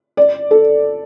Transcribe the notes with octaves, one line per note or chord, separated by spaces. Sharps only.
D5
A4